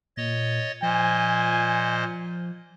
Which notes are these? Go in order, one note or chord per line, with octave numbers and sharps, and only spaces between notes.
A#2 C#5 D#5 A6
A#2 F3 C5 D#5 G#5